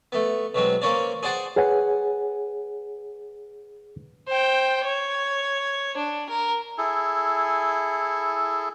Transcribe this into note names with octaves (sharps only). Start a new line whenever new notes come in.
A3 B3
B2 F#3 G#3 C4
A#3 C4 C#4 C#5 D5
G#4 C5 D5 F#5 G5
G#4 B4 C#5 F#5 G#5
C5 G5
C#5
D4
A#4
E4 G#4 A4